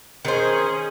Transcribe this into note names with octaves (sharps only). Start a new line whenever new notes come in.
D#3 C#4 G#4 C5